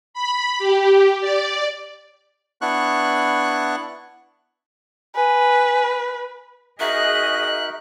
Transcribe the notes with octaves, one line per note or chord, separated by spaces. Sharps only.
B5
G4
D5
B3 D4 E4 C#6 F#6
B4 G#5
D#4 F#4 G#4 A#4 D#5 E5 F#6